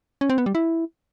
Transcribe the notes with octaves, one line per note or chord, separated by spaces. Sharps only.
C#4
C4
B3
G3
E4